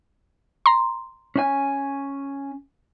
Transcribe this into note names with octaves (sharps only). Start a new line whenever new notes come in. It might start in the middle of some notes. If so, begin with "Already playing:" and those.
A#5 C6
C#4 D4 G#5